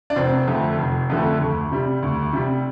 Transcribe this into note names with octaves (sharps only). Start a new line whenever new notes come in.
D4
F1 C4
F2 D3 A3
F1
F2 D3 A3
D2
C3 G3
D2
C3 G3